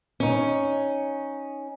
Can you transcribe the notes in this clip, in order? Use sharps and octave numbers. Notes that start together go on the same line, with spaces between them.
C#4 D#4